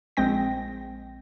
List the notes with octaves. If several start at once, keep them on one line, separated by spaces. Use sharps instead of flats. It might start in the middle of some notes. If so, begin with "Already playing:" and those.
A#1 G#3 C4 G5 A#6